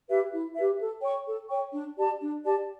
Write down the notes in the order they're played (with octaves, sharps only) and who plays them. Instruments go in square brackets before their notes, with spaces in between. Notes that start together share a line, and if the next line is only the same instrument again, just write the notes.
[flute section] G4 B4 E5
E4
G4 B4 E5
A4
C#5 G5 C#6
A4
C#5 G5 C#6
D4
G4 D5 A5
D4
G4 D5 A5